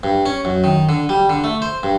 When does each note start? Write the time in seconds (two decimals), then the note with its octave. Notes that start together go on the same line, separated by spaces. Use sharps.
0.03 G2
0.26 C#4
0.45 F#2
0.64 D#3
0.89 D3
1.09 G3
1.29 D3
1.44 A3
1.62 C5
1.83 G2